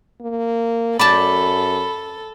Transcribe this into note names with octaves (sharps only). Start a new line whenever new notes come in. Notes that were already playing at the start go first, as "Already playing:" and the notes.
A#3
F#2 A4 D5 G5 A5 B5